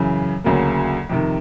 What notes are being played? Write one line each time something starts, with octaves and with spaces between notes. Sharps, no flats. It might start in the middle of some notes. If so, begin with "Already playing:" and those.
Already playing: F#2 C#3 E3
D2 C#3 F#3 A#3
F2 C3 D#3